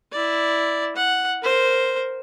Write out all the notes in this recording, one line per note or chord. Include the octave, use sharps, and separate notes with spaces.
E4 D5
F#5
A#4 C5